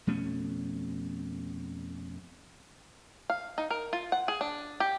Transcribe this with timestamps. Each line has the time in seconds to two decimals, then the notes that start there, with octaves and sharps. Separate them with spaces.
0.07 F2 B2 A3 C#4
3.30 F5
3.58 D#4
3.70 A#4
3.93 F4
4.12 F#5
4.28 G#4
4.41 D4
4.80 G4